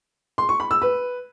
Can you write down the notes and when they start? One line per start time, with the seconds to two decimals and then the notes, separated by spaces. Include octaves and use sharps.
0.38 C6
0.49 C#6
0.60 B5
0.71 E6
0.82 B4